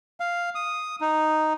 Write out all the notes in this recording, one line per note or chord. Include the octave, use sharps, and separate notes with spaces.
F5
D#6
D#4